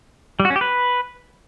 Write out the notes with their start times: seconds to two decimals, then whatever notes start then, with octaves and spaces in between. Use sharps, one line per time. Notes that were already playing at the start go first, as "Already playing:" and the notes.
0.40 G3
0.45 F#4
0.50 C#4
0.56 G4
0.61 B4